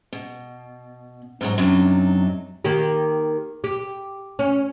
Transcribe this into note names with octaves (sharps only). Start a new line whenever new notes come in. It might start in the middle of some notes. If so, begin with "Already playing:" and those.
B2
G#2 B2 F#3
F#2 C3 F#3 D4 D#4
D#3 A#3 G4
G4
C#4